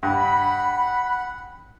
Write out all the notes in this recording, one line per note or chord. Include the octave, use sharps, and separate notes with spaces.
G2 F#5 B5